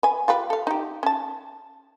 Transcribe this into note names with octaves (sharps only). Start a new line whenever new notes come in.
B4 G#5
F4 G4 B4
A4 F5
D#4 G4
C#4 A5